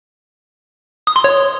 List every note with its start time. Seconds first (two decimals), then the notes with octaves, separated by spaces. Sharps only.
1.07 D#6
1.16 C6
1.24 C#5